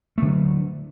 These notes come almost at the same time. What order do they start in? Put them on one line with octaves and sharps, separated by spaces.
A3 D3 F#3